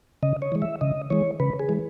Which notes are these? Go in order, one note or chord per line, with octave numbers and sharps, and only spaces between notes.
C#3 D#5
C#5
E3 G#3
E5
C#3 D#5
E3 G#3 C#5
C#3 B4
G#4
E3 G#3